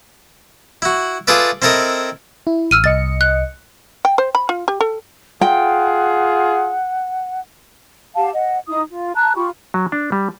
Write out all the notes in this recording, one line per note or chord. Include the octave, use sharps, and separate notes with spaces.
E4 F#4
F4 G#4 A4 B4 D5 E5
C4 E4 A4 A#4 D#5
E4
A1 E6 F6 D#7
C2 D#5 A6 C#7
F#6
G5
C5
B5
F4
G4
A4
F4 G#4 F#5 G5
G4 F5 F#5 A5
D#5 F#5
D#4 E4 D#6
F4
A5 A#5 F#6
F4 G4 B5 C#6
F#3
D4
G3